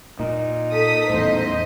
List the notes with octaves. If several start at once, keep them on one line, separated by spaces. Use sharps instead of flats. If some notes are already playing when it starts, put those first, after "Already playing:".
A#2 D#4
A4 D#6 B6
E2 A2 C5 D#5